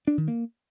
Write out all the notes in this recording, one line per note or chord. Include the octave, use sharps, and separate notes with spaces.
D4
D#3
A#3